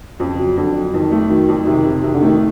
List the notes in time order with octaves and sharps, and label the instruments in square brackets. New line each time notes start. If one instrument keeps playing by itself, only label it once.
[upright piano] F2 [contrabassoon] C#3
[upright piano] F#3
[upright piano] F2 [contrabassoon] D3
[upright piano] F#3
[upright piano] F2 [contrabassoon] D#3
[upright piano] A3
[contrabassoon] D#3 [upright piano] F#3
[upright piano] F2
[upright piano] C3 [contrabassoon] D#3
[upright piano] C3
[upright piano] C3 [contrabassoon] D#3
[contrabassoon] D3
[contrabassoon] D#3 [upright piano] A3